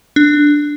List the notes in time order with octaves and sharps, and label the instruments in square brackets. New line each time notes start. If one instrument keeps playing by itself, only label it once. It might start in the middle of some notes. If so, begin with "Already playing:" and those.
[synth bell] D4